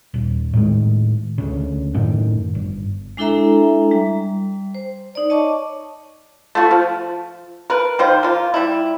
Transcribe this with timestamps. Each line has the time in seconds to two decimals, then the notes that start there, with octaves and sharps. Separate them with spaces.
0.14 D#1
0.53 A2 D#3 G#3
1.38 D2 C#3
1.94 F#2 A2 D#3
2.55 G1
3.17 G#3 D4 E4 A4 E5 A#5
3.91 G3
4.75 C5
5.15 D#4 D5
5.29 C#5 D#5 A5 C#6 D6
6.55 A3 F4 F#4
6.71 F3
7.70 A#4 B4
7.99 D#3 A#3 C5
8.23 A#3 F4
8.54 G3 E4